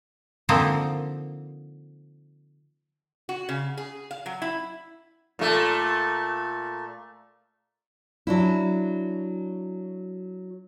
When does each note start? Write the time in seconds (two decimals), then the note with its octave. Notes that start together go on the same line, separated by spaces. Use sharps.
0.49 D3 F3 A#3 C4 D#4 C5
3.29 F#4
3.49 C#3
3.77 G#4
4.11 F5
4.26 F#3
4.42 E4
5.39 A#2 A3
8.27 F#3 D4 E4